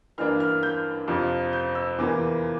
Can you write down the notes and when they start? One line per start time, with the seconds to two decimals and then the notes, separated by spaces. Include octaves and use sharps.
0.18 G2 E3 A#3 D4 F6
0.40 F6
0.63 G6
1.08 F2 C3 F3
1.53 G6
1.75 E6
1.98 E2 C3 E3 A#3 D6